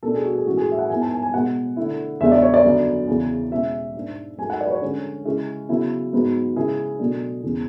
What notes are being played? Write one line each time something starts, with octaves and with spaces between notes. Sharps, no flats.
B2 A3 D4 A4
G#4
F#4
G#4
A2 E3 G#3 C#4 E4 F#4
G#4
E5
F#5
G#2 G#3 B3 E4 G#5
A5
G#5
G#5
B2 G#3 B3 F#5
D3 A3 E4
E2 C#3 G#3 D4 E5
D5
C#5
D5
F#2 D3 F#3 B3
E2 C#3 E3
B2 G#3 C#4 E4 E5
G#2 G#3 D4
G#2 F#3 A3 G#5
F#5
D5
B4
C#5
D3 G#3 C#4
C#3 G#3 C#4 E4
C#3 F#3 B3 E4
G#2 F#3 B3
C#3 G#3 C#4 E4 G#4
B2 F#3 A3 D4
E2 C#3 E3 G#3 C#4